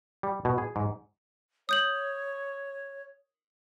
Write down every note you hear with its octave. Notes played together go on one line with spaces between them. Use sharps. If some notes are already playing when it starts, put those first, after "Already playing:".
G3
B2
G#4
G#2
C#5 D#6 G6 F#7